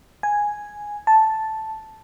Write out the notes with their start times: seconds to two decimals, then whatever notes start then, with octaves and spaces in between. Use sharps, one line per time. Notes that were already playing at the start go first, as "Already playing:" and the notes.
0.23 G#5
1.07 A5